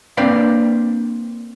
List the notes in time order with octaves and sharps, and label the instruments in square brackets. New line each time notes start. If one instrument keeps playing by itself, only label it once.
[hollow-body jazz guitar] A#3 C4 D4 B4 D5 F5